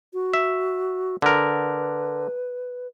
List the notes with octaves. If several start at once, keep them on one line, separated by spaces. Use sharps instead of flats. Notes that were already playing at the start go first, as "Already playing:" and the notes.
F#4
E5
D3 A#4 B4